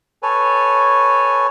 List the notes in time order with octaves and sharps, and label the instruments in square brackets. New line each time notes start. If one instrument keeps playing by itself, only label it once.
[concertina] A4 B4 C#5 G#5